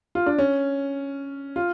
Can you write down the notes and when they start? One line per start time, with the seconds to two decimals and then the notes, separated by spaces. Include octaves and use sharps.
0.15 F4
0.26 D4
0.38 C#4
1.56 F4